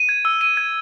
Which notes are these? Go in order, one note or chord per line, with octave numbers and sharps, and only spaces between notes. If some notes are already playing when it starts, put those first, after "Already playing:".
Already playing: D#7
G#6
E6
D#7
G#6